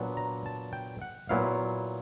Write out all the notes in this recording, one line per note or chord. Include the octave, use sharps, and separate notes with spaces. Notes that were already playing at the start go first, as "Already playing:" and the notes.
Already playing: A#2 F#3 B3 D4
A#5
A5
G5
F#5
A#2 F#3 B3 E4 F5